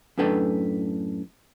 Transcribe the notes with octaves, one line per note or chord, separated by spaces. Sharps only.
F#2 A2 D4 A4 B4 G5